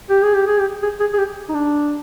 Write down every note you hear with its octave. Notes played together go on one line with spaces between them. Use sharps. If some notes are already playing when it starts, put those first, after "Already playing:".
G4
G#4
G4
G#4
G4
G#4
G#4
G#4
G4
D#4
D4